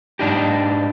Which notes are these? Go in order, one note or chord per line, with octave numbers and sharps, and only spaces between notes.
G#2 C#3 D4 D#4 G4